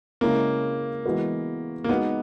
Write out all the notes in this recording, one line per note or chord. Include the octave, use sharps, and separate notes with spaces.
C#3 G#3 A#3 C#4 E4 A#4
E3 G#3 B3 F#4
A#3
G#3 B3 D#4 F#4